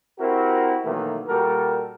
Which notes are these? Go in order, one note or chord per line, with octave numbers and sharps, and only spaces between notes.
C4 E4 F#4 G4 A#4
B2 D#3 E3 F#3 A3 A#3
A#2 G3 F#4 A4 A#4